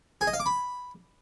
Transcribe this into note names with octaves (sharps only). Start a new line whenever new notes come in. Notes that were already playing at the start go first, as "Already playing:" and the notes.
G#4
D#5
F5
D6
B5